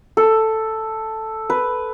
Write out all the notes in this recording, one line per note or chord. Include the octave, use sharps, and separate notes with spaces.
A4
B4